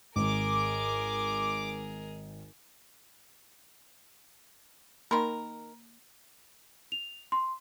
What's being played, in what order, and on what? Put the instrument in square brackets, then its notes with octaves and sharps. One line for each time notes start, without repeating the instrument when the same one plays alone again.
[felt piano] G#1 [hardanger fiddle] G#4 A#4 [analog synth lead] D6
[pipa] D#3 A#4 [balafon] A#3 B5 C6
[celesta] F7
C6